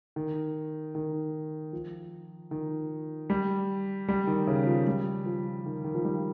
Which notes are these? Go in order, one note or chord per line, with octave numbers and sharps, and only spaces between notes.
D#3
D#3
F3
D#3
G3
G3
D#3
C#3
F3
G3
F3
D#3
D#3
F3
G3